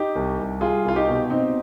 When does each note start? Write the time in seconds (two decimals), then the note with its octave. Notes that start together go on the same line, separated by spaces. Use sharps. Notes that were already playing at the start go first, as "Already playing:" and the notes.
Already playing: D#4 G4
0.15 C2
0.39 C2
0.61 G3 F4 G#4
0.85 C2 F4
0.96 D#4 G4
1.08 B2
1.30 B2 C4 D#4